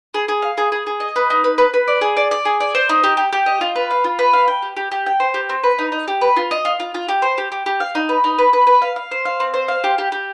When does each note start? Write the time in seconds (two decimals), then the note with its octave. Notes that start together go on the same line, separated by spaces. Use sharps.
0.14 G#4
0.28 G#4
0.42 F5
0.58 G#4
0.72 G#4
0.87 G#4
1.00 D#5
1.16 B4
1.30 D#4
1.44 B4
1.58 B4
1.74 B4
1.88 D5
2.01 G#4
2.17 D5
2.31 D5
2.45 G#4
2.60 D5
2.75 C5
2.89 D#4
3.04 G4
3.17 G4
3.33 G4
3.46 D#5
3.61 F4
3.76 B4
3.91 F5
4.04 F4
4.19 B4
4.33 F5
4.48 G5
4.62 G4
4.77 G4
4.92 G4
5.06 G5
5.20 C5
5.34 G4
5.49 C4
5.63 B4
5.79 D#4
5.92 D#4
6.08 G4
6.21 B4
6.36 F4
6.51 D#5
6.65 F4
6.80 F4
6.94 F4
7.08 G4
7.22 C5
7.38 G4
7.52 G4
7.66 G4
7.80 F5
7.95 D#4
8.09 B4
8.24 D#4
8.38 B4
8.53 B4
8.67 B4
8.82 F5
8.96 F5
9.11 C5
9.25 F5
9.40 C4
9.54 C5
9.68 F5
9.84 G4
9.98 G4
10.12 G4